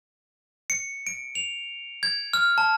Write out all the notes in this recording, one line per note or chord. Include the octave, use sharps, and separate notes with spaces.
C#7
D7
F7
G#6
F6
A5